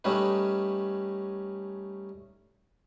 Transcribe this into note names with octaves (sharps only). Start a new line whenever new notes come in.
G3 A3 C#4 D#4 B4